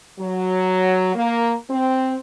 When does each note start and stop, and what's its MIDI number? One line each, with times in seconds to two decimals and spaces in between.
0.19 1.13 54
1.15 1.53 58
1.70 2.16 60